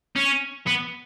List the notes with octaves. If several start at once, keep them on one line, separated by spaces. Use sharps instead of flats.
C#4
B3